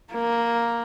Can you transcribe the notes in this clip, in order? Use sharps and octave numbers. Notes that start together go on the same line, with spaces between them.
A#3